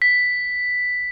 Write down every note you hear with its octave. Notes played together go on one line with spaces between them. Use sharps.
B6